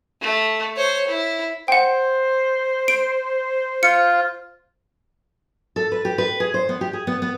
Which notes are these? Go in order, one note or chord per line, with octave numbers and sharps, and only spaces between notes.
A3
C5 C#5
E4
C5 F#5 G5
D7
F4 C#7
A4
B4
G4
B4
G#4
C5
B3
G4
G#4
B3
B3